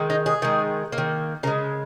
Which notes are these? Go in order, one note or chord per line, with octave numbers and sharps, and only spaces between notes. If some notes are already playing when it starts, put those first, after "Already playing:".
Already playing: D#3 G#3
D#4
G#4
D#3 G#3
A#3
D#3
C#3 G#3 A#4